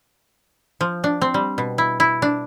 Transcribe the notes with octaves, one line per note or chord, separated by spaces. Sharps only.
F3
D4
C4
G3
B2
E4
E4
D4